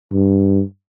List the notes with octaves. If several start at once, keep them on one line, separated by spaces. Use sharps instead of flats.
G2